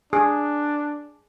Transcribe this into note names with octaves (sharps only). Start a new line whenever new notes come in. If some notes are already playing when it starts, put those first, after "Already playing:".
D4 G#4